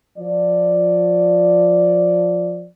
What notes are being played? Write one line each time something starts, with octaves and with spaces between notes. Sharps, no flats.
F3 D5